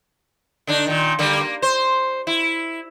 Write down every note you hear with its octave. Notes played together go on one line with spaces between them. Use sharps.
D3 D4 D#4
A#2 D#3
D3 G3 A#3
A#3
C5
E4